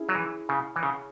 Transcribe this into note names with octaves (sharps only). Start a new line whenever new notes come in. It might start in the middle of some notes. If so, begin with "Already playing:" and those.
Already playing: C#4 E4 G#4
F#3
E3
C#3
E3
C#3